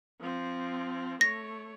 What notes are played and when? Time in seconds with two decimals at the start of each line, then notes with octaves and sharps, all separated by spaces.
0.21 F3 C4
1.21 A3 C#5 A#6